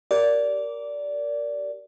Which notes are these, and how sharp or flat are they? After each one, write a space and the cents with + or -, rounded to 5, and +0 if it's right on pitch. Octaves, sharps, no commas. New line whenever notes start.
G4 -15 A#4 +0 D5 -15